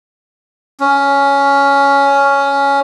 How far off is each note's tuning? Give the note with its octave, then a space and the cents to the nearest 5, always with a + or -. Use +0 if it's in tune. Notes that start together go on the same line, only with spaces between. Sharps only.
C#4 +10